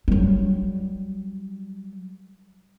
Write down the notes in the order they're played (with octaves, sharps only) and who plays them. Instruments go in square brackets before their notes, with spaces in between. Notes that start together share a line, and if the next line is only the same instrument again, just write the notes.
[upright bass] F#3 G3